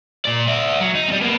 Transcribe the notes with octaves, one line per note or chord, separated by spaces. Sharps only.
A#2 D5
D5 E5
F#3
D#4
G3 C4
A#3 B3